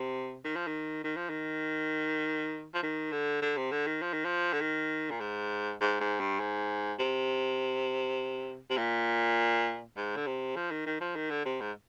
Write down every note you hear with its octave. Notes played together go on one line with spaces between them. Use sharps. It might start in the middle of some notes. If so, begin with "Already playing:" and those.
Already playing: C3
D#3
F3
D#3
D#3
F3
D#3
F3
D#3
D3
D3
C3
D3
D#3
F3
D#3
F3
D3
D#3
A#2
G#2
G#2
G#2
G2
G#2
C3
C3
A#2
G#2
D3
C3
F3
D#3
D#3
F3
D#3
D3
C3
G#2